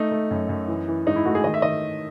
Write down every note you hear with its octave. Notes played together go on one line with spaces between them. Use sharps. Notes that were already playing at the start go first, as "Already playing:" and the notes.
Already playing: A3 D#4
A3
F#2
F#2
E3
E3
G#2 D#4
E4
A3 F#4
G#4
D#3 D#5
E5
D#3 D#5